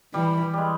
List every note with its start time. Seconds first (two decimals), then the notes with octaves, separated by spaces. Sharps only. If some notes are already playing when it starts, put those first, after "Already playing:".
0.14 E3 G3
0.54 G3 G#3